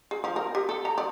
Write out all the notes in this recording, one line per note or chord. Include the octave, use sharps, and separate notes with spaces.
G#4
F3
A#4
G4
A4
A#5
D5